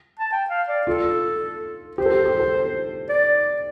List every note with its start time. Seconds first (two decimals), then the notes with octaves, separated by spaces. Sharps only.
0.19 A5
0.32 G5
0.50 F5
0.68 D5
0.87 F4 A4
1.98 G4 C5
2.06 A4
2.12 G4
2.26 G4
2.39 A4
3.09 D5